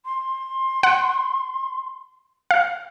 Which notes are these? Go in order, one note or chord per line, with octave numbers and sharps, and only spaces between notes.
C6
F#5
F5